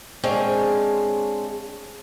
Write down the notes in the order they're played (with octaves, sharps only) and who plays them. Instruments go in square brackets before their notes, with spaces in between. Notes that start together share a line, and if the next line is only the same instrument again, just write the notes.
[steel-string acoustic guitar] G#3 C4 D4 G#4 C#5 F5